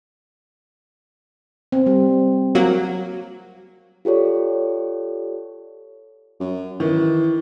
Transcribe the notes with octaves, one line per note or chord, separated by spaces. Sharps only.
C4
G3
F#3 A#3 F#4
F4 G4 A4 C#5 D5
F#2
D#3 E3